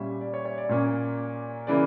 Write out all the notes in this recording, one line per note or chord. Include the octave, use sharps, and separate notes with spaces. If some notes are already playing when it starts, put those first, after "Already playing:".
Already playing: A#2 G3 C#4 E5
D5
C#5
C#5
D5
A#2 A#3 C#4
C#3 E3 A#3 D5